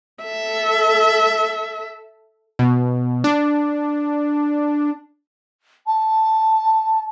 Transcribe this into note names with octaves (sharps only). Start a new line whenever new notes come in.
A4 E5
B2
D4
A5